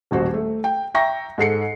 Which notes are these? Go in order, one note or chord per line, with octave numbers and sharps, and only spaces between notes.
D#1 A1 F#4 C5
A3
G5
E5 G5 A#5 C#6 A#6
G#2 A4 C7 C#7